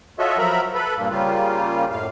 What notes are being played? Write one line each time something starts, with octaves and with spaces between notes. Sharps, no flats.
F4 F#4 A4 C#5 D#5 E5
F3 F#3 A#4 E5 A#5 B5
A4 B4 B5
G2 A#2 A#3
C#3 G3 A#3 F4
F#2 A2 F5